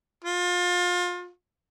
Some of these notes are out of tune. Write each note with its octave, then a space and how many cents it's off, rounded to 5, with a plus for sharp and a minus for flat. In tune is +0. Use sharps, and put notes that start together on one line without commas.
F4 +30